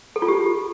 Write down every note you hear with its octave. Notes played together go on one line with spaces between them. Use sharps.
A4
F4
G4